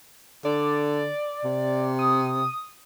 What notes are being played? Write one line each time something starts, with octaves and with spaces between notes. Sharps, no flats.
D3 D5
C3
D#6